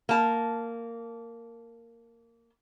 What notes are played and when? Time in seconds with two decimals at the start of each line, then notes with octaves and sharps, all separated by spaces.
0.09 A#3 A5